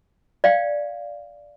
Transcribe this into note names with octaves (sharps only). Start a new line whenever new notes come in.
D5 F5 G5